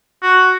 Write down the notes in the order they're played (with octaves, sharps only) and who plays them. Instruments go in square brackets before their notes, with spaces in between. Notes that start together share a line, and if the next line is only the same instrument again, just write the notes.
[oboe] F#4